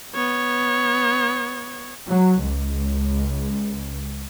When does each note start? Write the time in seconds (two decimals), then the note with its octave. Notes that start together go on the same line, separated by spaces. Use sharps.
0.15 B3 C#5
2.10 F#3
2.43 C#2